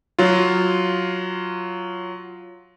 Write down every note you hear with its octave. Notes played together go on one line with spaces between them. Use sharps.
F#3 F4